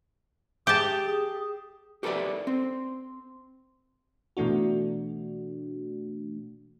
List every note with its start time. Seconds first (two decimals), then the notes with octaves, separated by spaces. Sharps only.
0.67 G4 G#4 A5
1.09 G#4
2.03 G4 A4 B4 C5 D5 E5
2.47 C4
4.37 B2 E3 A3 D4 F#4